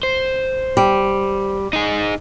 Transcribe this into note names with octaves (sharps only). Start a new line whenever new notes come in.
C5
G3
D#4 G#4